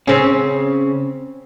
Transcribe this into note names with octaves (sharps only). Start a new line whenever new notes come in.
C#3 C4 C#4